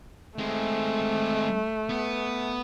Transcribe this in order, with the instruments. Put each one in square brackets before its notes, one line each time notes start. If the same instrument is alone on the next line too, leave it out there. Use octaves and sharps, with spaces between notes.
[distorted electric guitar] G#3 C4 [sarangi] A3
[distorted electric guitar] B3